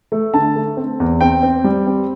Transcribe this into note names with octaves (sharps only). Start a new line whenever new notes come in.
A3
D3 A5
A3
C4
E2
C4 G5
C4
G3
C4